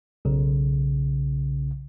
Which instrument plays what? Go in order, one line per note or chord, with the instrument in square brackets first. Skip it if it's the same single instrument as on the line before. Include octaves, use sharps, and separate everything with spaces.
[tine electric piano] B1 C#3